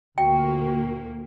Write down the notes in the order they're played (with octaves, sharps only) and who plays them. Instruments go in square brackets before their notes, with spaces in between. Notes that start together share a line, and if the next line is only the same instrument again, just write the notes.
[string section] D2 A#2 A#3 [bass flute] F#4 [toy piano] G5